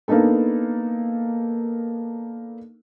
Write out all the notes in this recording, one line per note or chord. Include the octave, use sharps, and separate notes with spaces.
A#3 B3 D4 D#4 A4